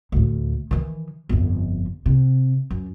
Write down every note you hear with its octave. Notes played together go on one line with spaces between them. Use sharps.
D2 A2
D#3 E3
G1 F2
C3
F#2